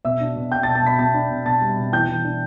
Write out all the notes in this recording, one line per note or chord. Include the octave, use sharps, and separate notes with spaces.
B2 E5 E6
D4
B2
B2 G5 G6
A5 A6
B2
A5 A6
B2 B5 B6
B2 A5 A6
D4
B2
B2 A5 A6
G3
B2
E3 G5 G6
E3
D4